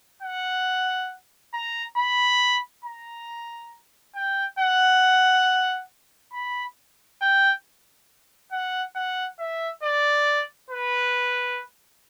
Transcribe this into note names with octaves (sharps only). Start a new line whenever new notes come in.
F#5
A#5
B5
A#5
G5
F#5
B5
G5
F#5
F#5
E5
D5
B4